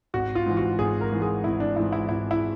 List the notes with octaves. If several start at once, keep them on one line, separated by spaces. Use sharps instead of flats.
G#1 F#4
F4
G#2 E3
F#4
G#1 G#4
A#4
G#2 E3
G#4
G#1 E4
D4
G#2 E3 E4
E4
G#1 E4
E4